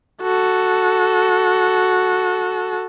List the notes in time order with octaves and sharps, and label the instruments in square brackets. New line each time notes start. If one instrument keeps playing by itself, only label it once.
[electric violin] F#4 A4